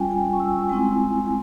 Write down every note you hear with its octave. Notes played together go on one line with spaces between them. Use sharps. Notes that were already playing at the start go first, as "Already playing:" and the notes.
Already playing: G3 C#4 F4 G5 G#5
G#5
C#6
E6
G#3 C4 E4 G#5